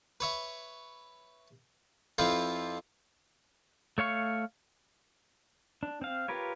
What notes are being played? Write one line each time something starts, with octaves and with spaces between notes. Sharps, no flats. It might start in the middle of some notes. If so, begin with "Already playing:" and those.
B4 C#5 E5
F2 F3 E4 F4 B4
A3 C#5 F5 C#6
D4
C4 F5
F4 G4 A#4 B4 C#5